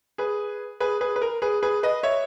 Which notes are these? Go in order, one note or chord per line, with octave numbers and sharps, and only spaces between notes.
G#4 B4
G#4 B4
G#4 B4
B4
A#4
G#4 B4
G#4 B4
B4 D#5
C#5 E5